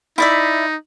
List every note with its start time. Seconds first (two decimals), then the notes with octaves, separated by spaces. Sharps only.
0.18 D#4 E4 D5 E5